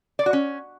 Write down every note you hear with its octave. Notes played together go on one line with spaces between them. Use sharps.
D5
F#4
C#4